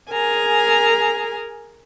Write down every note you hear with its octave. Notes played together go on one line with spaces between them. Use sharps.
G#4 A#4 G#5 A#5